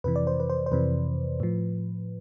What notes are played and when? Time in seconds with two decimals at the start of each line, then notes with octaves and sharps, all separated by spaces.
0.04 F2 C3 E3 B4
0.16 D5
0.27 C5
0.40 B4
0.50 C5
0.66 C5
0.72 F2 C3 E3 B4
1.40 A2 F3